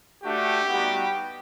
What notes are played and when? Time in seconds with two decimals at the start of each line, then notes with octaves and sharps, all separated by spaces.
0.23 A3 D4 F#4 G4
0.68 G3 B3 D#4 F#4